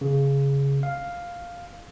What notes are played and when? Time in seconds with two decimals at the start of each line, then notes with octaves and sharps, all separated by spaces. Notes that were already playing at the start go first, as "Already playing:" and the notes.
0.01 C#3
0.83 F5